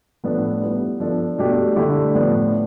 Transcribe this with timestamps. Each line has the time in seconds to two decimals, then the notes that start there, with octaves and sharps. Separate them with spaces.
0.24 A2 F3 B3 D4 A4
0.62 G3 B3 E4
1.00 F3 B3 D4 A4
1.38 B2 A3 D4 G4
1.76 D3 A3 E4 G4
2.15 A2 F3 B3 D4